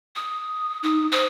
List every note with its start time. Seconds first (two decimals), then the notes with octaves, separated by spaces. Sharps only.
0.15 D#6
0.83 D#4 D#6
1.12 C5 D#6